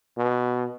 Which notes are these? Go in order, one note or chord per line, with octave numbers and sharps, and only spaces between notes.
B2